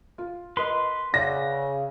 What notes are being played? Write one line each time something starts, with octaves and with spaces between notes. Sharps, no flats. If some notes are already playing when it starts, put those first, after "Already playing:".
F4
A#4 B4 D#5 C6
C#3 D5 E5 F#5 A#6